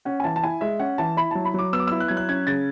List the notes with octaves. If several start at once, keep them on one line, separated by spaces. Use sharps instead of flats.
C#4 F#5
G#5
E3 A5
A5
E4 G#5
G#3 E5
C#4 F#5
E3 A5
E4 B5
F#3 A5
B5
F#3 D6
B3 E6
D6
E4 E6
F#6
F#3 G#6
F#6
C#4 G#6
C#3 A6